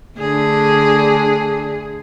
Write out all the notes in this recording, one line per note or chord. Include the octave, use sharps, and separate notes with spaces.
D3 A3 D4 G#4